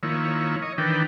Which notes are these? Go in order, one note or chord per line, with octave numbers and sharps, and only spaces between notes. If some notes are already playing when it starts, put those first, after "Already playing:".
D#3 F3 A#3 E4 C#5
C#5 D#5
D#3 E3 D4 A#4 B4 G5